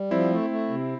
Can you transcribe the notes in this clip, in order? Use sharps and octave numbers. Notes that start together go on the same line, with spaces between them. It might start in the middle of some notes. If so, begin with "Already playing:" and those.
Already playing: G3
F3 C4 E4
A3
A3
C3